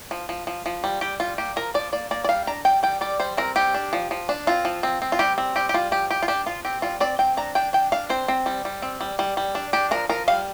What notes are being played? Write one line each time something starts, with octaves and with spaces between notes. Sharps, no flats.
F3
F3
F3
F3
G3
G3 G4
G3 F4
A#3 G4
F3 A#4
F3 D5
A#3 D5
A#3 D5
D5
G3 F5
D4 A#5
G3 G5
G3 G5
G3 D5
G3 C5
C4 A#4
G3 G4
D4
F3
F3
D4
C4 F4
F3
C4
C4
F4
G3 G4
C4
G3 G4
G4
G3 F4
F3 G4
F3 G4
F4
D4 G4
F3 F4
C4 G4
G3 F4
C4 D5
C4 G5
D4 A#5
D4 G5
D4 G5
D4 F5
C4 C5
C4
G3
G3
C4
G3
G3
G3
D4
D4 G4
F3 A#4
F3 A#4
G3 F5